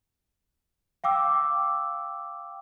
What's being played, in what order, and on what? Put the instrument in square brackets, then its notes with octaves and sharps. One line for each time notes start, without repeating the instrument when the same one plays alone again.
[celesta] F5 G5 D6 E6